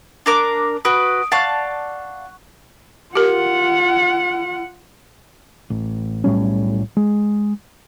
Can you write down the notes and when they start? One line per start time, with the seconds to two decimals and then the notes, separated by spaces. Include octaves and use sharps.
0.26 D4 A#4 D6
0.85 F#4 B4 D#6 D7
1.32 D5 F5 F#5 A5 C#6 F#6
3.15 F4 G4 A#4 F#5
5.70 A1
6.24 B1 A2 G3 C#4
6.97 G#3